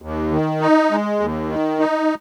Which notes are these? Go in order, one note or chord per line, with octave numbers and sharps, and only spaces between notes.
D#2
D#3
D#4
G#3
D#2
D#3
D#4